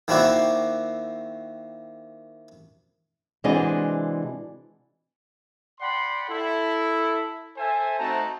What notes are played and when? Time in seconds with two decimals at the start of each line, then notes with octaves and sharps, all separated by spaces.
0.08 D#3 A#3 C4 E4 F#4 D5
3.44 C3 E3 G#3 D4 F#4 D#5
5.80 D5 F#5 G5 B5 C6
6.29 E4 A4
7.57 A4 C5 E5 G#5
7.98 A3 C4 D#4 F#4 A5 A#5